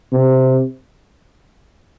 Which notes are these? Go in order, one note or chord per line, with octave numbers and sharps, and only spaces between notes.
C3